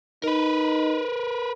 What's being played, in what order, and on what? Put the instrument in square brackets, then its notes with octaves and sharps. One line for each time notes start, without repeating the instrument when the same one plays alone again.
[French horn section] D#4 [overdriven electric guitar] A#4 B4